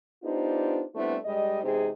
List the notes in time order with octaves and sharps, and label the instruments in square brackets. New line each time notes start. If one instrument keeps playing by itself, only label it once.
[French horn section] B3 D4 D#4 F4 G4 C5
G3 A3 B3 C4 D4 E4
G2 G3 G#3 D#5
E2 C3 G#3 C4 D#4 G#4